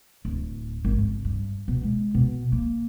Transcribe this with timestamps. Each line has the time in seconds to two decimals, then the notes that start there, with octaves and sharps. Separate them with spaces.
0.25 D1
0.85 G#1
0.99 C#3
1.25 G2
1.68 B2
1.83 G#3
2.14 B2
2.52 A#3